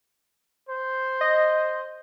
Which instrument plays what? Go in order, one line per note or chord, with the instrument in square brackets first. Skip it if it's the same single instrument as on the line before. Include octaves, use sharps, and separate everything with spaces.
[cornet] C5
[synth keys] D#5